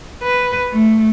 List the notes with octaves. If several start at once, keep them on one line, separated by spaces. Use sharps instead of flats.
B4
A3